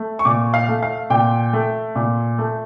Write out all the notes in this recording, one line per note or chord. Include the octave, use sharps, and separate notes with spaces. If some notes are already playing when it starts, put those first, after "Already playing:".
Already playing: A3
C#6
A#2 D6
F5
A3
F5
A#2 G5
A3
A#2
A3